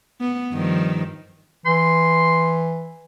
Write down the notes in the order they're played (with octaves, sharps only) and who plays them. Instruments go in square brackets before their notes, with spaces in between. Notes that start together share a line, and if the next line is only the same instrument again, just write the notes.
[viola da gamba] B3
G2 D#3 F3
[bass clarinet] E3 [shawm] C6